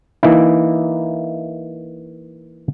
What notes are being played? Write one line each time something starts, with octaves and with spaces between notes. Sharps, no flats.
E3 A#3 D#4 E4